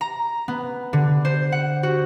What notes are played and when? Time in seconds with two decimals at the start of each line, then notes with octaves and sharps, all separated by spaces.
0.01 A#5
0.48 B3
0.93 D3
1.25 C5
1.52 F#5
1.83 F#4